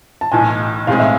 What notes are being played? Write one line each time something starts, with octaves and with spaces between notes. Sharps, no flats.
A5
B1 A2 E3 G#5
B1 A2 G#3 C4 G#4 F5
E5